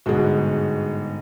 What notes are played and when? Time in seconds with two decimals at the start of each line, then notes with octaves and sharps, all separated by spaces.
0.06 G1 G#2 B2 F#4 G#4